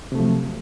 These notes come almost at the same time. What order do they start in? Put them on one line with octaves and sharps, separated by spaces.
C3 A3 F3 F#3